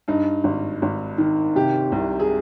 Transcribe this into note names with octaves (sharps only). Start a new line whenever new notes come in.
G2 D#4
G#1
G#1
D#3
C3 G4
C2
G#4